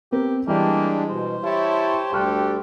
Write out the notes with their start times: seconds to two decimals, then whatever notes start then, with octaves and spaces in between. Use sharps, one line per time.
0.12 B3 C4 G4 A#4
0.48 E3 G3 G#3 A#3 D4 G4
1.09 B2 C5
1.44 E4 G4 C#5 A5
2.13 D2 G3 G4 A4 C#6 F6 F#6